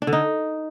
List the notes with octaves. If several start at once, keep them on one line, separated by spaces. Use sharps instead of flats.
D4
D3
D#4